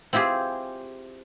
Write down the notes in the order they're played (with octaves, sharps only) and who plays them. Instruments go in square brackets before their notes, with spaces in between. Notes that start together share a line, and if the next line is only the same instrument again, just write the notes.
[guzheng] C4 E4 F4 G4 G#4